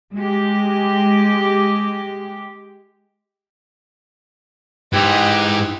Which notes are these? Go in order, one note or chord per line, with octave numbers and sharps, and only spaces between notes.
G#3 G4
G#2 E3 G4 D#5